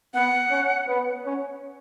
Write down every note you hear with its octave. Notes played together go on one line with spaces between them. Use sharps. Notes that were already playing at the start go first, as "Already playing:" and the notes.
B3 F#5
C#4
B3
C#4